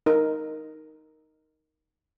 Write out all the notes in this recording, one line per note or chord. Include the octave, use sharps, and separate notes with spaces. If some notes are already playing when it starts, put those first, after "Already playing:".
D#4 A#4